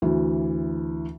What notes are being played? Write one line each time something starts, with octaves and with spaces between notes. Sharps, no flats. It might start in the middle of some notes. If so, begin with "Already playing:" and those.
D2 E3